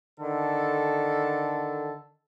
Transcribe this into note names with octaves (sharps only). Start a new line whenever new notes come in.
D3 D#3 A4